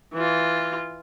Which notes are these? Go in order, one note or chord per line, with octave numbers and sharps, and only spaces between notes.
E3 F4